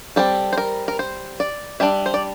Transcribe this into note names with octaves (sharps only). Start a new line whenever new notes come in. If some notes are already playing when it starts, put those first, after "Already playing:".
G3 C4 A4
C5
A#4
A#4
C5
D5
G3 D4 E5
C5
D5